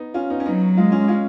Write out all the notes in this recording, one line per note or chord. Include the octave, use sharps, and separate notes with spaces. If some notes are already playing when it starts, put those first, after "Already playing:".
Already playing: B3 D#4
C#4 F4
B3 D#4
C#4
F#3 B3 D#4
G#3 F4
C#4 F4
C#4 F4